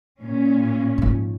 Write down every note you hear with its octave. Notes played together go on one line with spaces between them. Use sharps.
A#2 C#4
G#2 F3